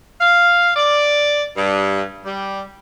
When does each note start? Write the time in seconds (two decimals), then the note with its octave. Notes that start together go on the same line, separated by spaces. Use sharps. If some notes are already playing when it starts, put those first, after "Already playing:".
0.20 F5
0.76 D5
1.56 G2
2.25 G3